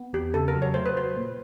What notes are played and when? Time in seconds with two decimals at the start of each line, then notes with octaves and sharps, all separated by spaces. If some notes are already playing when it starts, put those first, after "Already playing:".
Already playing: B3
0.13 E2 G4
0.34 C#3 A4
0.48 A#4
0.55 F#3
0.62 C#5
0.74 A3 C5
0.86 B4
0.96 F#3 C5
1.16 A#2